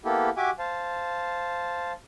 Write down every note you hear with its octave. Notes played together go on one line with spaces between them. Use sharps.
A#3 B3 E4 G4 A4
F#4 G4 E5 G#5 D6
C5 F5 A5